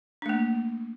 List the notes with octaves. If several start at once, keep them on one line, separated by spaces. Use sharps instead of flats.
A3 A#3 D4